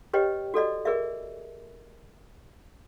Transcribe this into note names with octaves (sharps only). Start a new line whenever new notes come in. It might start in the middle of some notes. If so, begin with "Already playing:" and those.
G4 B4 C#5 D#5 G5
F#4 A4 D5 D#5
G#4 A#4 D5 E5